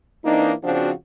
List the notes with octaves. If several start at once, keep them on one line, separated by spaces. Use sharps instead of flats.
E3 A#3 C4 D4 D#4
C#3 F3 C4 D4 F#4